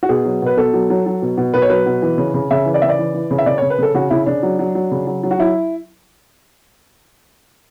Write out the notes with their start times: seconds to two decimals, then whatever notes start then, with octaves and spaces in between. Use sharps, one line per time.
0.03 F#4
0.09 B2 G#4
0.25 F#3
0.42 B2 B4
0.57 B2 A4
0.73 F#3
0.90 F#3
1.06 F#3
1.22 B2
1.37 B2
1.54 B2 B4
1.62 C#5
1.70 F#3 B4
1.86 B2
2.02 E3
2.18 C#3
2.34 C#3
2.51 C#3 E5
2.66 E3
2.74 D5
2.82 C#3 E5
2.89 D5
2.99 E3
3.14 E3
3.31 C#3
3.38 E5
3.46 C#3 D5
3.58 C#5
3.62 C#3
3.70 B4
3.79 C#3 A4
3.94 C#3 F#4
4.10 C#3 E4
4.26 C#3 D4
4.43 F#3
4.59 F#3
4.75 F#3
4.91 C#3
5.07 F#3
5.23 F#3
5.31 F#4
5.39 F#3 E4